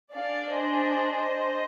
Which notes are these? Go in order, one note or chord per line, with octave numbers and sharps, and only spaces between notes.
D4 G#4 D5 F5
C5 D#5